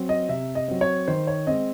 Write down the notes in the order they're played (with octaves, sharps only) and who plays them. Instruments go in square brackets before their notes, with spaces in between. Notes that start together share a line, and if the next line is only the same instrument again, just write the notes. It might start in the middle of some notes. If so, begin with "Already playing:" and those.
Already playing: [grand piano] F#3 C4
D#5
C3 E5
D#5
F#3 C4
C#5
D#3 C5
C#5
G#3 C4 D#5